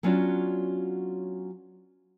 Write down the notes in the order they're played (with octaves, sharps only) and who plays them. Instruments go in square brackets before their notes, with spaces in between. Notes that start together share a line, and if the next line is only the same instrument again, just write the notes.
[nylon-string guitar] F#3 B3 C#4 D4 F4 F#4